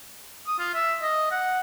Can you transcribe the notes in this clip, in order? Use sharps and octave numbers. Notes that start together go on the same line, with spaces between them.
D#6
F4
E5
D#5
F#5